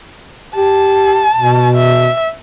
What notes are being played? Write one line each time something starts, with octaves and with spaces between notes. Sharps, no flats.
G4 A5
B2
E5